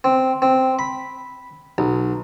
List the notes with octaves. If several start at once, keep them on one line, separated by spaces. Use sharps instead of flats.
C4
C4
B5
B1